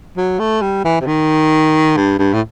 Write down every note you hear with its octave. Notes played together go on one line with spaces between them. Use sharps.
F#3
A3
G3
E3
C3
D#3
G2
G2
A2